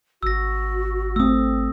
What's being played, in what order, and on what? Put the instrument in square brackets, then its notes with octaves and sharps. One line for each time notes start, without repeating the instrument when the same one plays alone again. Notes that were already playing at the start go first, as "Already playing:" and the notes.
[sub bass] G#1 [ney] F#4 [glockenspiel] E6 A#6
[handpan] A3 C4 [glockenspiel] D#6 E6